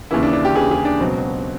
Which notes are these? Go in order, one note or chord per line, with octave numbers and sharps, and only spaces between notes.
D#2 C#3 E3 E4
D4
D4
G4
D#2 C#3 E3 G#4
G#4
D4
C#2 B2 F#3 C4